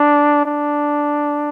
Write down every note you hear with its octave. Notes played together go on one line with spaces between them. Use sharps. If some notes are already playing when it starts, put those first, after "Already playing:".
Already playing: D4
D4